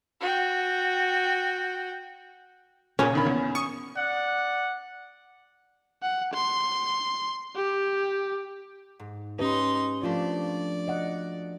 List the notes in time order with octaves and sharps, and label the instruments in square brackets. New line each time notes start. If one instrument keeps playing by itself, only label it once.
[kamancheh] F#4 G5
[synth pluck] A#2 C#3 [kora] C#4
[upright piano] E1 D#3 B5
E2
[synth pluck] C#6 [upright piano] D#6
[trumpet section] D5 F#5
[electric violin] F#5
C6
G4
[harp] G#2
[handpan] C#4 G4 B4 [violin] D#4 C6
[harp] F3 A3 D4 [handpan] F4 [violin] D5
[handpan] D#5 F#5